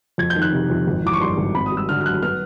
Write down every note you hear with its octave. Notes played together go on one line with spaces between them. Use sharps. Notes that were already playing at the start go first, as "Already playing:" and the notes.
F2 G#6
G6
D#3
F#6
C3
F2
G#1
E3 D6
C#6
G2 C6
G#1
C4 B5
D#6
G3
E6
D3 F6
F6
F#2 F#6
B3 F6